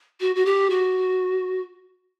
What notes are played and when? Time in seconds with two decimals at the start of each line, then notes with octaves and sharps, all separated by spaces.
0.20 F#4
0.35 F#4
0.46 G4
0.70 F#4